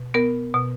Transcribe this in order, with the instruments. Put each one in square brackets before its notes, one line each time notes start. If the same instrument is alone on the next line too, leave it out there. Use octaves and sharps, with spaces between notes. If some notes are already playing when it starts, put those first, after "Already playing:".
Already playing: [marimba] B2
B3 A#4
B2